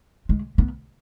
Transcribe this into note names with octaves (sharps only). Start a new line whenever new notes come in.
G#3
B3